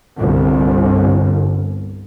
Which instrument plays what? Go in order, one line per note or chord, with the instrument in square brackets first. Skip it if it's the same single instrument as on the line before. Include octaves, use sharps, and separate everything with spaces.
[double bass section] G1 C2